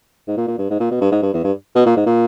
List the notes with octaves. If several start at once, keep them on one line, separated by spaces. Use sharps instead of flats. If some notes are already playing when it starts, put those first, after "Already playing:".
G#2
A#2
A#2
G2
G#2
A#2
B2
G2
G#2
G2
E2
G2
B2
A#2
G#2
A#2